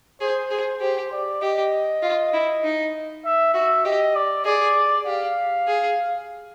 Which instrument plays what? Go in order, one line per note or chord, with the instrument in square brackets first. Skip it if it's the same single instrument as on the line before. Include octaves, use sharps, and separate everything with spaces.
[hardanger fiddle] G#4 [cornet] C5
[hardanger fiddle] G#4
[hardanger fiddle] G4 [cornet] C5
[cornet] D5
[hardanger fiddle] G4 [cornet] D#5
[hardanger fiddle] F4
E4
D#4
[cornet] E5
[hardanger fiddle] F#4 [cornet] E5
[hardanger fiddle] G4 [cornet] D#5
[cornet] D5
[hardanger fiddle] G#4 [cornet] D5
[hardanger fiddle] G4 [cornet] F5
[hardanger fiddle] G#4